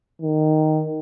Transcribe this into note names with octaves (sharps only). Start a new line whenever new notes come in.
D#3